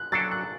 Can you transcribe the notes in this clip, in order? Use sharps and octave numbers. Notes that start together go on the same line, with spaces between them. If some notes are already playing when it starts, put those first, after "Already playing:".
Already playing: F#6
F#3 D4 A4 A6
F#6